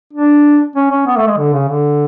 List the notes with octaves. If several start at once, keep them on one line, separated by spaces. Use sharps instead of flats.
D4
C#4
C#4
B3
A3
G#3
D3
C#3
D3